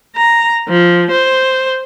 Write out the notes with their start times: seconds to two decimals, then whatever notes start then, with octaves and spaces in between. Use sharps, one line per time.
0.16 A#5
0.69 F3
1.11 C5